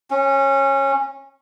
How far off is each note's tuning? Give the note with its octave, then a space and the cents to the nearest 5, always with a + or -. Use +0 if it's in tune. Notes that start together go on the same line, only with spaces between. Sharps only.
C#4 -20